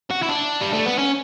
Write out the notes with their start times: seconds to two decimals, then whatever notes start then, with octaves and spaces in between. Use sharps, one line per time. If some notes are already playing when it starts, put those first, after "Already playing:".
0.10 F#4
0.22 E4
0.29 D4
0.61 G3
0.73 A3
0.86 B3
0.98 C#4